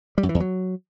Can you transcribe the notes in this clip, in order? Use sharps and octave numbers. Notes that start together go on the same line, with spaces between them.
G3
F#2
E3
E2
F#3